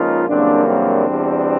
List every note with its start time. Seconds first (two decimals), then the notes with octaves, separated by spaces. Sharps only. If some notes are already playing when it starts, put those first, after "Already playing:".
Already playing: C#2 C#3 F3 A#3 D#4 F4
0.28 F#2 C#3 E3 G3 A#3 C4 D4
0.67 C4 D4
1.06 E2 B2 G3